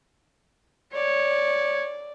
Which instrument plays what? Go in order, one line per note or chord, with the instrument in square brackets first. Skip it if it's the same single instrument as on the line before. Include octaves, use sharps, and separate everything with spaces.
[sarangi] C#5 [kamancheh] D5